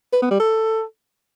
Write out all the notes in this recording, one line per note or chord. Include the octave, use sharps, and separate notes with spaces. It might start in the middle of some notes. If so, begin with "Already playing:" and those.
B4
B3
G3
A4